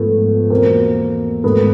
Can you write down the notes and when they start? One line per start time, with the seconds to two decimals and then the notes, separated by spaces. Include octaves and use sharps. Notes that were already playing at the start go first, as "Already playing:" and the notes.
Already playing: G#2 F3 A3 B3
0.50 E2 B2 A#3 C4
1.44 G#2 D#3 A3 B3